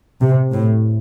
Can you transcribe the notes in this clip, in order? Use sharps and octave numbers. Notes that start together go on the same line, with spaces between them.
C3
A2